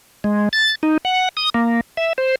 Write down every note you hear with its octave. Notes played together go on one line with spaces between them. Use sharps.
G#3
A6
D#4
F#5
D#6
A#3
E5
C5